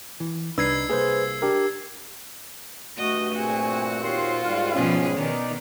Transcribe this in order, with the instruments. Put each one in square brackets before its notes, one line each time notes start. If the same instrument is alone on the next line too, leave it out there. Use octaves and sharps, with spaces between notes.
[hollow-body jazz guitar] E3
[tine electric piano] C2 [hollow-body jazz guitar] D4 D#4 B4 [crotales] E6 G#6 C7
[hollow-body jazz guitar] C2 A#3 [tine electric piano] G#4 B4 C5
[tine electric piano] D4 G4 A#4
[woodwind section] G2 A3 [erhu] F#4 [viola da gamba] D#5
[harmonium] A#2 C4 [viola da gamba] F#4 [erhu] G#4
[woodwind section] D#2 C#5 C6 [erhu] F4
[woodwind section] D#2 F5 [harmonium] G#2 G3
[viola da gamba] B2 F3 G#4 [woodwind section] C#4
[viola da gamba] B2 D#3 B3 [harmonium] D#4 D5